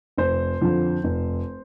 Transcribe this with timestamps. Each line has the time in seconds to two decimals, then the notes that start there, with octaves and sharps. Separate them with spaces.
0.18 F1 C5
0.61 F2 D3 F3
1.04 F1